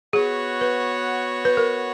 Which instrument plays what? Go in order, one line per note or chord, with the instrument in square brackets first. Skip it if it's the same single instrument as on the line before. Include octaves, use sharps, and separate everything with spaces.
[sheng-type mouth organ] B3 F#4 C#5 F#5 [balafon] G#4
[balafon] B4
B4
A#4